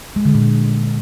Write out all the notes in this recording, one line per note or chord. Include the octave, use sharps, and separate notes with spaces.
G#3
D3
A#2